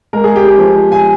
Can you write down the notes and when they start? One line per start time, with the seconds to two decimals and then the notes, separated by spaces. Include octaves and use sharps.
0.13 G#3 A#4
0.24 G#4
0.36 G4
0.47 G#4
0.59 F3
0.92 G#5